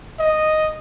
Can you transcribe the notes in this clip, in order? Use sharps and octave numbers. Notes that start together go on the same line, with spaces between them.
D#5